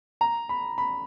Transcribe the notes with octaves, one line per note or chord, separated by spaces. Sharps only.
A#5
B5
B5